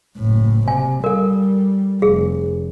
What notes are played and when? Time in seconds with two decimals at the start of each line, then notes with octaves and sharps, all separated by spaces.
0.17 F#1 A2
0.68 C3 G#5
1.04 G3 A4 A#4
2.02 F1 G#4